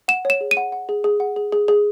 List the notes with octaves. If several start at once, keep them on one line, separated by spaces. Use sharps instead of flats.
F#5 E7
C#5 E7
G#4
D#7
F#5
F#5
G#4
G#4
F#5
G#4
G#4
G#4